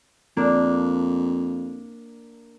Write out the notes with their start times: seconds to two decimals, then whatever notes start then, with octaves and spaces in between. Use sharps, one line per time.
0.37 F2 A#3 D4